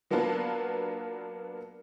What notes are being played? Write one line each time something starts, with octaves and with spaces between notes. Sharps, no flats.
F#3 A#3 B3 D4 F4